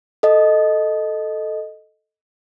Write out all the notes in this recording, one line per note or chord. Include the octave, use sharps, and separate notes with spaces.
A4 D#5